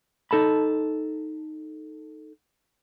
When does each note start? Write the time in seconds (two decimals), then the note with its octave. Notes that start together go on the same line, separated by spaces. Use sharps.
0.31 D#4 A4 A5 B5